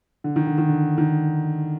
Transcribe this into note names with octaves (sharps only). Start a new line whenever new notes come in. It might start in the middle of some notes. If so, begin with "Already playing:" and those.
D3
D#3
D3
D#3
D3
D#3